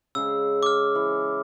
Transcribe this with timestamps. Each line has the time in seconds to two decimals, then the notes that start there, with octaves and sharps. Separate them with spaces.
0.15 C#3 G#3 E6
0.63 D6 F6
0.95 E3